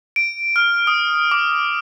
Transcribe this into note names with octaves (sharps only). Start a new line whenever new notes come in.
D7
F6
D#6
D6